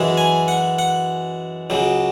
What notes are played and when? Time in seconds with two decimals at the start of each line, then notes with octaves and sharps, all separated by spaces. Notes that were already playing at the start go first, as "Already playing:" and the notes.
Already playing: F#2 E3 G#3
0.17 G#5
0.48 F#5
0.79 F#5
1.70 C#2 C#3 F#3